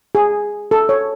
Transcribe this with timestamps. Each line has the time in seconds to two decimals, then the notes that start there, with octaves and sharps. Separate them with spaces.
0.15 G#4
0.71 A4
0.89 C#5